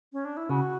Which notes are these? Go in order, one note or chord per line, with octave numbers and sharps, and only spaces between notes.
C#4
D4
E4
C#3 F#4